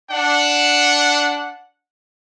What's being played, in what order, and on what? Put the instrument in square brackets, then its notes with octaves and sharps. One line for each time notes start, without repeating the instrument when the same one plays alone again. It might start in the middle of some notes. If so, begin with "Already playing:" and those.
[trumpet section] D4 F#5